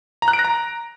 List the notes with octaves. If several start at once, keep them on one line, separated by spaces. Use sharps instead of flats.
A#5
F#6
D7
A#6
A#5